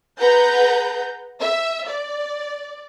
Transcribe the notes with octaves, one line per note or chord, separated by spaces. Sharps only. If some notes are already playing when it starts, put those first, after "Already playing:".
G#4 B4 F#5 A#5 G6
E5
D5